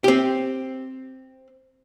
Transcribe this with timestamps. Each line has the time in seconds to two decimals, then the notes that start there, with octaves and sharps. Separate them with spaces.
0.04 C4 G4